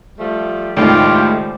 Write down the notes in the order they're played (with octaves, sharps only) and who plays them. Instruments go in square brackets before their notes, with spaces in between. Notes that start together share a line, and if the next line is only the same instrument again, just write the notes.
[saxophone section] F3 G3 A3
[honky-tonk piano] C#2 A2 D#3 [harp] G#3 C5 D5 [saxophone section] F4 G4